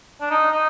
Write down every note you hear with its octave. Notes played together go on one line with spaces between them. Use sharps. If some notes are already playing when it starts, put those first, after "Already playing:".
D4
D#4
D#4